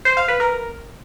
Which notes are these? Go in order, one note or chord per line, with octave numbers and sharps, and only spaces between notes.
C5
F5
B4
A#4